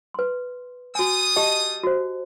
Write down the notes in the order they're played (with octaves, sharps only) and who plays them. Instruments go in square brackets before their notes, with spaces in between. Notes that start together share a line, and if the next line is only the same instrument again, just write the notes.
[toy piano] B4 C6
[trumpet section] G3 D#6 [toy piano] F#4 G#5
[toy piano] G4 D#5 A5
F#4 C5